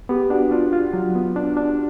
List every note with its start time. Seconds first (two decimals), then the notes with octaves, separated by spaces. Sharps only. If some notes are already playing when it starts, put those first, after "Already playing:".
0.09 B3 G4
0.30 D4 F#4
0.51 D4 F4
0.73 F4
0.93 F#3
1.15 B3
1.36 D4
1.57 D4